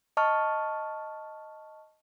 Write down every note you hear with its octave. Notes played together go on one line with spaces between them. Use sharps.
D#5 A5 C#6 F6